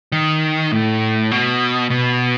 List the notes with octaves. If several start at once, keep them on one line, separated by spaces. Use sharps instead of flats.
D#3
A2
B2
B2